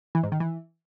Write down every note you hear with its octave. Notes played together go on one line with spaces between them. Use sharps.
E3
G#2
D#3
E3